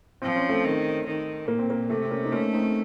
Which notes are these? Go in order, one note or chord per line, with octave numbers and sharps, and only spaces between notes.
F3 C4
C#4
A3 C4
D#3
D#3
A#2 A#3
C4
A#3
C3 A3 C4
C4
A#3 C#4
D#4
A3 A#3 C#4
C4 D#4